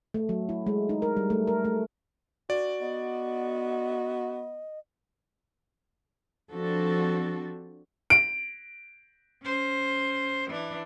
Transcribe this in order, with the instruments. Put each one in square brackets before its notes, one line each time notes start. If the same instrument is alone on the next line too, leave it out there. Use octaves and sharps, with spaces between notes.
[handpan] A3
F#3
E4
G#3
D#4
A#4
G3
A3
A#4
A3
[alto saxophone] F#4 [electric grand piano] D5
[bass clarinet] B3 [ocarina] D#5
[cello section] F3 C4 D4 F#4 A4
[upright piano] D7
[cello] C#4 C5
E3 D4